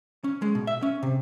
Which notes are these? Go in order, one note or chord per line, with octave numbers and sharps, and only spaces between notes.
C#4
G#3
B2
E5
C#4
C3